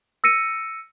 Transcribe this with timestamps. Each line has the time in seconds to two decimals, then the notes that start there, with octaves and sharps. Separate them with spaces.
0.24 E6 A#6 C#7 D#7